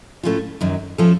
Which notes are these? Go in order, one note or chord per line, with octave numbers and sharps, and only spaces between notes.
A2 A3 C#4 F4
F#2 D#3 F#3
F3 A3 C#4 A4